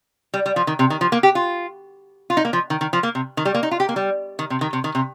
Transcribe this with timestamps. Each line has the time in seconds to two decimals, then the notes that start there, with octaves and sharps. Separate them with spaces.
0.34 G3
0.46 G3
0.56 F3
0.67 D#3
0.79 C3
0.90 D#3
1.01 F3
1.12 A#3
1.23 G4
1.35 F4
2.30 F4
2.37 D#4
2.45 A#3
2.53 F3
2.70 D#3
2.81 D#3
2.93 F3
3.03 A#3
3.15 C3
3.37 D#3
3.45 G3
3.54 A#3
3.63 D#4
3.71 F4
3.80 G4
3.89 A#3
3.96 G3
4.39 D#3
4.50 C3
4.61 D#3
4.73 C3
4.84 D#3
4.95 C3